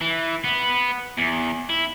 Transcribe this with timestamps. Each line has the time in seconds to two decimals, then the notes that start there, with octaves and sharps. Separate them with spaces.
0.01 E3
0.44 B3
1.18 E2
1.70 E4